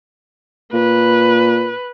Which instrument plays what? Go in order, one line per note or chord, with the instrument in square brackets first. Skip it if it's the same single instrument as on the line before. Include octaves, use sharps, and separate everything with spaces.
[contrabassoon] A#2 [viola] B4